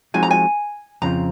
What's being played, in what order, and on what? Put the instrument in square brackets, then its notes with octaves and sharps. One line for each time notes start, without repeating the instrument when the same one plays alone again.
[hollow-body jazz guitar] F3 G#3 C4 D#4 F#4 [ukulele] G#5
[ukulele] A#5
G#5
[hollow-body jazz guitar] F2 C#3 F3 C4 F4 [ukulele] A#5